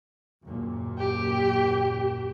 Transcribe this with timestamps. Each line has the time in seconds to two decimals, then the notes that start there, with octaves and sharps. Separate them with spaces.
0.43 F#1 D#2 A#2
0.98 G4